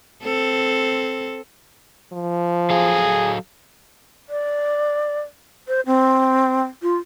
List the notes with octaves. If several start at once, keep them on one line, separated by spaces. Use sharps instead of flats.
C4 A4
F3
F#3 G#4 A4 F5
D5
C5
C4
F4